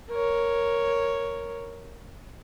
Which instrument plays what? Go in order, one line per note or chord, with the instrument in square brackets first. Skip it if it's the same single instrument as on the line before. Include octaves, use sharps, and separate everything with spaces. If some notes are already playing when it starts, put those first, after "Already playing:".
[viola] A#4 C#5